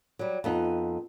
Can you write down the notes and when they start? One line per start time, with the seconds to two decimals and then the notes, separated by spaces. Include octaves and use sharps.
0.19 F#3 G3
0.44 F2 B3 D#4